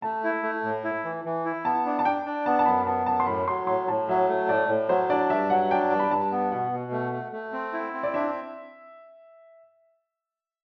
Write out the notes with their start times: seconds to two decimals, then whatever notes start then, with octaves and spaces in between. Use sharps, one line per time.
0.02 A3 A5
0.24 E4
0.43 A3
0.63 A2
0.84 E4
1.05 E3
1.25 E3
1.45 E4
1.65 B3 A5
1.85 D4
1.99 A5
2.05 D4 G5
2.26 D4
2.46 B3 A5
2.59 A5
2.66 F#2 B5
2.86 B3 A5
3.06 F#2 A5
3.20 C6
3.27 A2 B5
3.48 F#3 C6
3.67 A2 C6
3.88 A2 A5
4.09 F#3 E5
4.29 A3
4.49 A2 D5
4.69 A2
4.89 F#3 C5
5.09 D4 D5
5.30 G2 E5
5.50 F#3 F#5
5.71 D4 G5
5.91 G2
6.00 B5
6.10 G2 A5
6.32 B3
6.52 B2 F#5
6.72 B2
6.91 A3
7.12 A3
7.32 A3
7.52 C4
7.73 E4
7.93 C4
8.03 D5
8.14 D4 E5